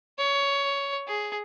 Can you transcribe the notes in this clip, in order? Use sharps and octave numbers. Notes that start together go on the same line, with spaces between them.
C#5
G#4